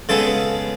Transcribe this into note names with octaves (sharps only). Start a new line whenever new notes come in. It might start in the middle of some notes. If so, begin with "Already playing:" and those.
C#3 G#3 B3 A4